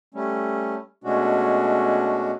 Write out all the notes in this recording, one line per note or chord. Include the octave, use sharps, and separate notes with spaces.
G3 A3 C#4
B2 G#3 A3 C#4 D4 F#4